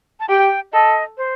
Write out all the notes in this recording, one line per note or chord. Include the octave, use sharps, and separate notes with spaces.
A5
G4 G5
A4 D#5
C5